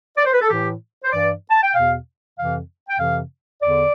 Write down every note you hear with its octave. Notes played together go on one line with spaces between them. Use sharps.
D5
C5
B4
A4
A2 E3 G4
C5
G2 E3 D5
A5
G5
E2 B2 F5
F2 C3 E3 F5
G5
F2 C3 E3 F5
E2 D3 D5